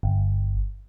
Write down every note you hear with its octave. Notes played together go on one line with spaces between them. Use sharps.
G1